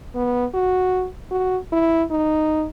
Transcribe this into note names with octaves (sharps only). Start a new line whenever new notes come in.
B3
F#4
F#4
E4
D#4